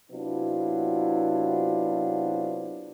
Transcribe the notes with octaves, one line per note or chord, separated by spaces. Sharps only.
C3 F#3 B3 D4 E4 F4